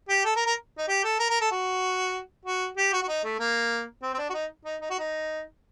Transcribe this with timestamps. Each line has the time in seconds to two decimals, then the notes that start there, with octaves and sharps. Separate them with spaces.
0.09 G4
0.25 A4
0.36 A#4
0.46 A#4
0.78 D#4
0.88 G4
1.04 A4
1.19 A#4
1.30 A#4
1.41 A4
1.51 F#4
2.45 F#4
2.77 G4
2.93 F#4
3.03 F#4
3.08 D#4
3.24 A3
3.39 A#3
4.02 C4
4.14 C4
4.18 D4
4.29 F#4
4.34 D#4
4.65 D#4
4.81 D#4
4.90 F#4
4.99 D#4